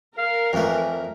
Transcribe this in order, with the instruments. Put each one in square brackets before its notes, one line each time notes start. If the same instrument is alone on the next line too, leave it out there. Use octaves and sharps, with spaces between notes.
[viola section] A#4 [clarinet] F5
[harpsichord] F2 A3 [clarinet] E3